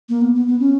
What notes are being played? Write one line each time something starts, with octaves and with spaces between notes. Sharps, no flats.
A#3
B3
B3
B3
C#4